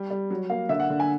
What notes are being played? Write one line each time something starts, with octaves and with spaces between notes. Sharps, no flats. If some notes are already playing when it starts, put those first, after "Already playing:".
Already playing: G3
G3
F#3
A#3 F5
D3 E5
F#5
D3
G#5